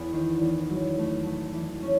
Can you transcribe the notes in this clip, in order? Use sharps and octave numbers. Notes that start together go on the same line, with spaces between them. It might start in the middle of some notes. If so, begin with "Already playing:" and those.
Already playing: E2
D#3
E2
F#3
A3
A3
E3
C#4